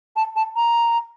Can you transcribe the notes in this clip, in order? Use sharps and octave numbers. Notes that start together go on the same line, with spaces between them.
A5
A5
A#5